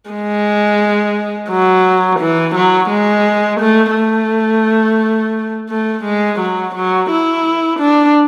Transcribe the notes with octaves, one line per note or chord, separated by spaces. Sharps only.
G#3
F#3
E3
F#3
G#3
A3
A3
A3
G#3
F#3
F#3
E4
D4